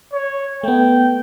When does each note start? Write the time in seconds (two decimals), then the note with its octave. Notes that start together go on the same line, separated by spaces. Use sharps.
0.13 C#5
0.63 A3 B3 G5